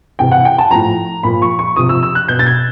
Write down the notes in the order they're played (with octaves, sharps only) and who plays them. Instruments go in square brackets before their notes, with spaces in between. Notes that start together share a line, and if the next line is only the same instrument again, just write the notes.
[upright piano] C3 E3 G5
F#5
G5
A5
A2 F3 A#5
A#2 F3 B5
C#6
C#6
C3 F3 D#6
E6
E6
F#6
B2 G6
A6
G#6